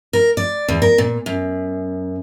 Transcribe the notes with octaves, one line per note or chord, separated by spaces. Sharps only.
A#4
D5
E2
A#4
A#2
F#2